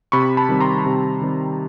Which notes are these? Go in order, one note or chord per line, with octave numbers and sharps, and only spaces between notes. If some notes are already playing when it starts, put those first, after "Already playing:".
C3 B5 C#6
A5 B5
D#3 G3 C4
A#5 C6
C3
D#3 G3 C4